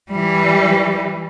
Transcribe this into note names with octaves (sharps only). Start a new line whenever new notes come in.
E3 G3